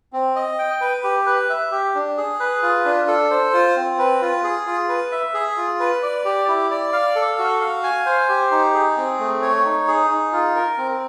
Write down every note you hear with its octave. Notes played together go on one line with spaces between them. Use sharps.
C4
D#5
G5
B4
G4
B4
E5
G4
D4
G#4
B4
F4
D4
A4
C5
F4
C4
B4
F4
G#4
F4
B4
E5
G#4
F4
B4
D5
G4
E4
D5
F5
A4
F#4
F5
G#5
C5
G4
D#4
G#4
C4
A3
C#5
D#4
G#4
D#4
F4
A#4
C4